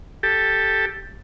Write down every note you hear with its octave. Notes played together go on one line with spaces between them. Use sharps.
G4 A4